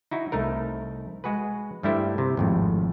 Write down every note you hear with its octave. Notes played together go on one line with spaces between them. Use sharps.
D#4 E4 F#4
C2 A3 D#4 A#4
G#3 F#4 G#4 B4
G2 G3 A3 E4 G4 C5
C3
G#1 F2 A2